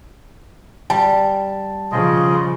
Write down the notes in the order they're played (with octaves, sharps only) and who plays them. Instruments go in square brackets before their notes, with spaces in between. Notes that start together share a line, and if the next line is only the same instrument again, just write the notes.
[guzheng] G3 [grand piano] A5
[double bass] C#3 F3 [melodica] F4 G#4 D#5